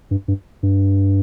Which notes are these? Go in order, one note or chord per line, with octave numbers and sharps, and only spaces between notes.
G2
G2
G2